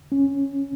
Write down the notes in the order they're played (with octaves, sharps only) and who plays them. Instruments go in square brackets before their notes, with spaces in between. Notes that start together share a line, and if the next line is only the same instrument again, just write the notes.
[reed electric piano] C#4